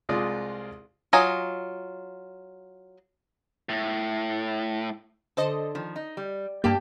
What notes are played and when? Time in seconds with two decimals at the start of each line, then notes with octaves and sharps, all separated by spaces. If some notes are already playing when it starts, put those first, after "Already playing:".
0.09 C2 C3 G#3 F4 D5 D#6
1.13 F#3 F4 D#5 G#5 A#5
3.69 A2
5.37 D3 A4 C5 D#5
5.75 D#3 F3
5.96 D#4
6.17 G3
6.64 G2 A#3 G4 G5 A5